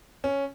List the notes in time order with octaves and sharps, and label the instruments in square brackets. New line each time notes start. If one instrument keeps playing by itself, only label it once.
[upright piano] C#4